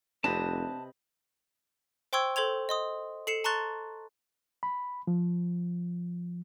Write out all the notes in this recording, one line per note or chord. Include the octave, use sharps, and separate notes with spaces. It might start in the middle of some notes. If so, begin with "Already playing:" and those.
F1 C3 C4 D4 B4 D#5 A5
C5 G5 C6 C#6 E6 G#6
A4 C5 C6 G#6 F7
D#5 C6 D#6
A4 C7 C#7 E7
A5 A#5 C6 C#6 F#6 A6
B5
F3